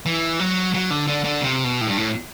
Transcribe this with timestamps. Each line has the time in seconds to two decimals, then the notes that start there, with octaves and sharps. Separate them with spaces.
0.06 E3
0.39 F#3
0.74 F#3
0.91 D3
1.07 D3
1.24 D3
1.41 C3
1.64 B2
1.81 A2
1.87 G2
1.98 A2